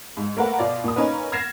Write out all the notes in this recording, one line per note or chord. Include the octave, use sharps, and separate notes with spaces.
G#2
A3 A#3 A#4 B4 F#5
B2 F4 D5
A#2 D#6
A#3 C#4 D#4 A#4 B4
F6 G#6 A#6 C7 E7